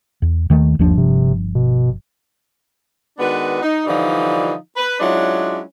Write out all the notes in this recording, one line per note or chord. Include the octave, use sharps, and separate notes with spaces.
E2
D#2 D#3 A3
G1 D#2 F3 D4
C3
B2
D#3 G#3 B3 D4 F#4 B4
D#4
D3 E3 F3 G3 D#4 F4
B4
F#3 G#3 C#4 D4 E4 F4